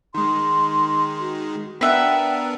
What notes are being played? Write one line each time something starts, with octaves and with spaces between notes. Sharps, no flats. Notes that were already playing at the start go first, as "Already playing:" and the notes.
D#3 G#3 C6
F#4
B3 D4 A#4 B4 E5 F#5 G5